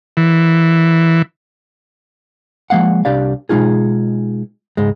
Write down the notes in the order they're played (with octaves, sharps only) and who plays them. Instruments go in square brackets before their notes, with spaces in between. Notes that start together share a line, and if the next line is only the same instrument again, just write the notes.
[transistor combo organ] E3
[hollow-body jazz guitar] F3 G#3 A#3 F5 F#5
C2 D4 G4 D5 F5
B2 G#3 D#4 F4 G#4
C#2 G#2 G#3